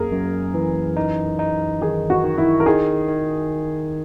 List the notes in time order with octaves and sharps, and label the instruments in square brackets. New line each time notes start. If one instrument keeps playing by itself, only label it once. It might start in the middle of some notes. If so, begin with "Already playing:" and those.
Already playing: [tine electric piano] F#2 A#3 [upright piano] G#4 A#4
[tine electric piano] F#2
E3
D#4
D#4
[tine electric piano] D#3 [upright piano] G#4
[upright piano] F#4
[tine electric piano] D#3
[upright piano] E4
A#4
[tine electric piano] D#3 [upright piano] G#4
[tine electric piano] D#3